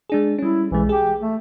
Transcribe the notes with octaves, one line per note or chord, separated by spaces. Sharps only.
G#3 D4 G#4
G3 C#4 E4
B1 E3 G#3
G4 G#4
A3